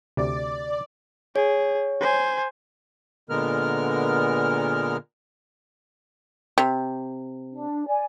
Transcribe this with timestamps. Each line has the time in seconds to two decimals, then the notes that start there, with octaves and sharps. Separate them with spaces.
0.17 D2 C3 D5
1.36 G#4 C#5
2.01 C5 G#5
3.30 A#2 D3 G#3 B3 A#4 F6
6.58 C3
7.52 D4
7.87 D5 G#5